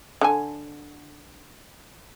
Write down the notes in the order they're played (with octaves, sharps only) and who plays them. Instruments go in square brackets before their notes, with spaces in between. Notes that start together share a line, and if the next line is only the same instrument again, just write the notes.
[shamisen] D3 A4 G#5